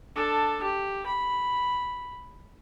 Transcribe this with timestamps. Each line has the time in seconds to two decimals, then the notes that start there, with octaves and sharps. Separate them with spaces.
0.15 D4 A4
0.62 G4
1.06 B5